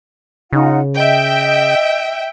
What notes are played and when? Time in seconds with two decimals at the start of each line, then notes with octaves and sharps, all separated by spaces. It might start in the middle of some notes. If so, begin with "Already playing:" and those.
0.53 C#3 D#4 F4 F#5
0.94 D#5 E5 G5